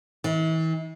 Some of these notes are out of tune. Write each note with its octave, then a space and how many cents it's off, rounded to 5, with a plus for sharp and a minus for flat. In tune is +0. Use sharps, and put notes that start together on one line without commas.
E3 -40